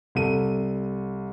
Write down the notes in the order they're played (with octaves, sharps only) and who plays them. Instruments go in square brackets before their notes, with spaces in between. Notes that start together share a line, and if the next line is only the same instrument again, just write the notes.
[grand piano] C2 A4 D#7